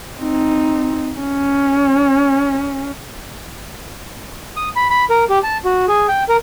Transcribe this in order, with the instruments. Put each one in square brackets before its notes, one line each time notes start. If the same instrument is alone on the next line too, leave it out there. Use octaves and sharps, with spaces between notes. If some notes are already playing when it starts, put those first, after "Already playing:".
[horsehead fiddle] C4 D#4
C#4
[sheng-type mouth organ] D#6
B5
B5
A#4
G4
A5
F#4
G#4
G5
A#4